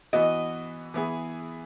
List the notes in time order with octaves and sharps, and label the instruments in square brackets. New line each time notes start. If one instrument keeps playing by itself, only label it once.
[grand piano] E3 B3 F#4 [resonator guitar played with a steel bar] D#5
[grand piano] E3 B3 E4 G#4